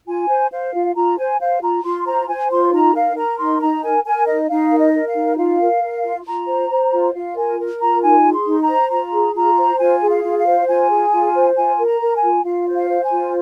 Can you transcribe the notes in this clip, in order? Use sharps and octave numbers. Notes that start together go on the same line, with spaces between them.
F4 G#5
C5
C5 F5
F4
F4 A#5
C5 G#5
C5 F5
F4 A#5
F4 C6
C5 A#5
C5 G#5
F4 C6
D#4 A#5
A#4 F5
A#4 A#5
D#4 C6
D#4 A#5
A#4 G#5
A#4 G#5
D#4 D#5
D#4 F5
A#4
D#5
A#4
F5
D#4
F4 F5
A#4
A#4
F4
F4 A#5
C5
C5
F4
F4 F5
A#4 G#5
A#4
F4 A#5
D#4 G#5
G#4
C6
D#4
A#5
C5
F4 A#5
G#4
F4 A#5
C5
F4 G#5
G#4
F5
F4
F5
C5
F4 G#5
G#4
F4
C5
F4 G#5
A#4
A#5
A#4
G#5
F4
F4 F5
C5
F5
C5
G#5
F4